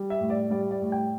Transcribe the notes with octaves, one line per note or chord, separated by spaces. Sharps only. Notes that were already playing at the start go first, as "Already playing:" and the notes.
Already playing: G3
E5
A2
D5
G3 D5
D5
A2
G5